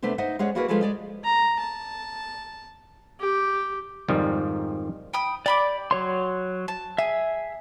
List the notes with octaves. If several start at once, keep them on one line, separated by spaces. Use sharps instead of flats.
C3 A3 B3 D4 C5
D#4 C5 D#5 E5 F#5
G#3 C#4 G#4 C#5 D5 F#5
A#3 E4 F#4 G#4 A#4 B4
F3 G#3 F4 G#4 A4 B4
G#3 D5 D#5
A#5
A5
G4
F2 G#2 D#3 F3 G3
G5 B5 D#6
G4 D5 B5 D6
F#3 C#5 C6
A5
G#4 E5